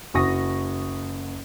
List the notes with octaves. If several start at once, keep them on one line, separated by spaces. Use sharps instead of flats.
F#1 F#4 C#6 D#6 A#6